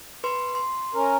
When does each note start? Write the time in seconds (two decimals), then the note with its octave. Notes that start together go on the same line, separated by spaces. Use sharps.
0.24 B4 C6
0.55 C6
0.95 C#4 A#4